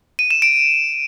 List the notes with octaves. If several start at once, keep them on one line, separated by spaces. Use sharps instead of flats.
D#7
E7
D7